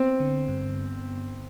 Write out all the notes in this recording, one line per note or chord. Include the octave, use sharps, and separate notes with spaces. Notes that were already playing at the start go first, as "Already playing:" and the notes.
Already playing: B3 C4
D3
G2